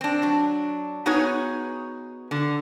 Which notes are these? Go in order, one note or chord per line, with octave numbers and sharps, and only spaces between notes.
C4 D4
F#3 D4
B3 D#4 F#4 G#4 B4 C#5
D3